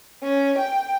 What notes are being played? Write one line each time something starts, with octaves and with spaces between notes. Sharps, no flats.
C#4
G5